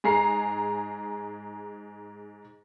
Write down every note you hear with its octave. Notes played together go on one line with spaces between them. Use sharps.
G#2 G#4 A#5 C7